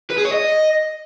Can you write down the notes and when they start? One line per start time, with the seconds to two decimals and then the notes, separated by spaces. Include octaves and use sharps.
0.10 B4
0.18 G#4
0.25 C#5
0.32 D#5